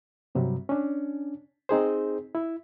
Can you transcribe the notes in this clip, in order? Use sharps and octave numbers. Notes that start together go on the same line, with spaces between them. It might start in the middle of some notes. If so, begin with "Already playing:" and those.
G2 C3 F#3 G3
C#4 D4
C4 D#4 G#4 C5
E4